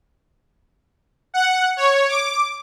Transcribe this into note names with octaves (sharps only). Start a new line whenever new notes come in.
F#5
C#5
D6